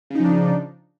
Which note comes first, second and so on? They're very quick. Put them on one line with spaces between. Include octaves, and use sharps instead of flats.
C#3 D#4 F3 D4